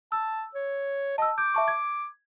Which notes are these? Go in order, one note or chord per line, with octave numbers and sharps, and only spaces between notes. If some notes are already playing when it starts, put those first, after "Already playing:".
A5 E6
C#5
D#5 A5 E6
D6 G6
E5 A5 C#6
G#6